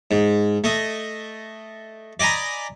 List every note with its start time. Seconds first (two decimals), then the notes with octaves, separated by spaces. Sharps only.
0.11 G#2
0.64 A3 D#5
2.20 D5 D#5 G#5 A#5 B5